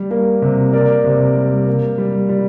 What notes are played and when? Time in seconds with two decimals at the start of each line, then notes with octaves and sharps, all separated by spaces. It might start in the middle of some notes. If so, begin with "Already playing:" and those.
Already playing: G3
0.11 A#3
0.42 C3
0.73 A#3 A#4 D5
1.04 C3
1.36 G3
1.67 A#3
1.98 G3
2.29 G3